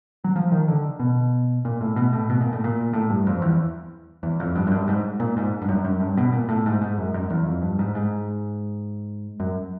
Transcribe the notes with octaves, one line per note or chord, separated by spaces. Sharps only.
F#3
F3
D#3
D3
B2
A#2
A2
B2
A2
B2
A#2
A2
A#2
A2
G2
F2
E2
E2
F2
G2
F#2
G2
G#2
A#2
G#2
G2
F#2
F#2
G2
B2
A#2
A2
G#2
G#2
F#2
F#2
E2
F2
G2
G#2
G#2
F#2